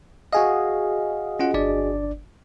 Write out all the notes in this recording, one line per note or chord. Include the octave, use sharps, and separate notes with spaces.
F#4 G#4 D#5 F5
C#4 F4 F#5
G1 D4 D5